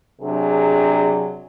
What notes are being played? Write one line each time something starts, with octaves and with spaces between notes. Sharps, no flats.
C3 F#3 D4 G#4